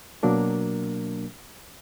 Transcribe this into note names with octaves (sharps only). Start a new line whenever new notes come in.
B2 F#3 A#3 D4 A#4